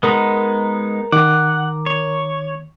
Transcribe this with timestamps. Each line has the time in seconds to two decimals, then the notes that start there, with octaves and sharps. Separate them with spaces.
0.03 G#3 B3 D#4 A#4 A#5
1.12 D#3 F#5 D6
1.86 C#5